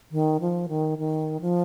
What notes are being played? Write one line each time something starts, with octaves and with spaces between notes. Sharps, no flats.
D#3
F3
D#3
D#3
F3